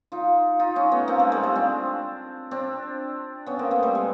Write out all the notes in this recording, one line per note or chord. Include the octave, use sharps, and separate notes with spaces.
D#4 F4
D#4 F4
C#4 D#4
A3 B3
A#3 C4
G#3 A#3
G3 A3
G#3
C4 D4
C4 D4
B3 C#4
A#3 C4
A3 B3
G3 A3
G#3